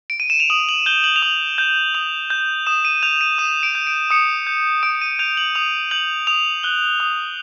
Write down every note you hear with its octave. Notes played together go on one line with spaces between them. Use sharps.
D7
D#7
E7
F7
D#6 F#7
F#7
G6 G7
F#7
F7
D#6 F#7
G6
D#6 F7
G6
D#6 E7
D#7
G6 F7
D#7
D#6 E7
D7
G6
D7
D#6 C#7
G6
D#6 D7
D#7
G6 F7
F#7
D#6 F7
G6 F#7
D#6 F7
F#6 G7
D#6